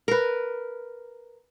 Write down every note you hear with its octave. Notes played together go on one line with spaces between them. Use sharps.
A#4 B4